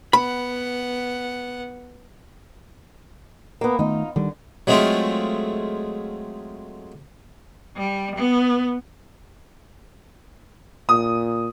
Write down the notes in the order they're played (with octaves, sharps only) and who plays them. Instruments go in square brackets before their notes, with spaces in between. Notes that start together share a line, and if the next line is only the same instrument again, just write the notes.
[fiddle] B3 F#5 [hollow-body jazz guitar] B5
[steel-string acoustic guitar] A#3 B3
[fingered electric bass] D#3 A3 [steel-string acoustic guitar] D#4 F4
[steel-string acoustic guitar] D3 [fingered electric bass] D#3 G3
[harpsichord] F#3 G#3 A3 C4 F4
[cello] G3
B3
[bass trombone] A#2 [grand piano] D#6